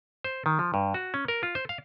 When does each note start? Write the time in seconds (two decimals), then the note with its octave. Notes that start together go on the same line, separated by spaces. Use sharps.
0.24 C5
0.46 D#3
0.59 F3
0.74 G2
0.94 F#4
1.14 C#4
1.28 A#4
1.43 F4
1.55 C5
1.69 F5